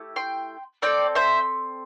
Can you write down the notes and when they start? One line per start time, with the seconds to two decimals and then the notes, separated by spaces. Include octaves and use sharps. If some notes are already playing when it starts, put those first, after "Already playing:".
Already playing: A3 E4 G4
0.16 G5 C6
0.82 C4 A4 D5 G5
1.15 C5 E5